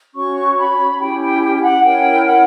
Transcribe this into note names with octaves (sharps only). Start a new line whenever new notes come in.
C#4 F#4 C#5 C#6
B5
C#4 E4 G4 G5
G5
G5
G5
F#5
C#4 E4 A#4 C#5 G5
F#5